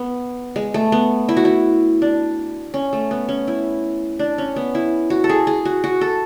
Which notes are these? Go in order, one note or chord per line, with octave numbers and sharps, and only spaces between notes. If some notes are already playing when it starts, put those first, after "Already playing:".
Already playing: B3
G#3
A3
B3
E4
F#4
E4
D4
C#4
A3
B3
C#4
E4
D4
C#4
B3
E4
F#4
A4
G#4
G#4
F#4
F#4
A4